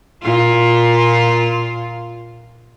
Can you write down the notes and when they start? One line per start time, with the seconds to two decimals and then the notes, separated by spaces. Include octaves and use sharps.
0.23 A#2 F4